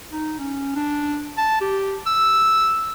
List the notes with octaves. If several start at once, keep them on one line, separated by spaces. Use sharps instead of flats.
D#4
C#4
D4
A5
G4
E6